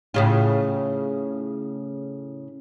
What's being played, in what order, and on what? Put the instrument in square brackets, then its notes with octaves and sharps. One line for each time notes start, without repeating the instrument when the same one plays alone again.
[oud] A2 C#3 F4